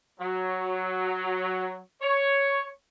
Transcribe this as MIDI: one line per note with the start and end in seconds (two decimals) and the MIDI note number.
0.19 1.80 54
2.02 2.67 73